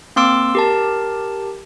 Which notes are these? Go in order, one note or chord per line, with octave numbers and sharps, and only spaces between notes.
A#3 C4 C6 D6 E6 D7
G4 A#4 A5